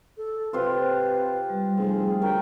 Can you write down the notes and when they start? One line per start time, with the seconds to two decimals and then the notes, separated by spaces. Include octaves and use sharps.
0.17 A4
0.53 C3 F4 G4 B4 C5
1.50 G3
1.77 F1 C4 G#4
2.22 D2 A#4 C#5 G5